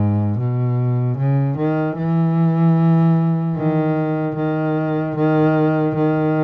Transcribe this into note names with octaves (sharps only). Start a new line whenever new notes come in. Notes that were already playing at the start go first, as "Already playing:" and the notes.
Already playing: G#2
B2
C#3
D#3
E3
D#3
D#3
D#3
D#3